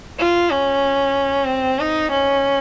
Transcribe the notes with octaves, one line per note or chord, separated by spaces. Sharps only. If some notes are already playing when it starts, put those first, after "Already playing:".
F4
C#4
C4
D#4
C#4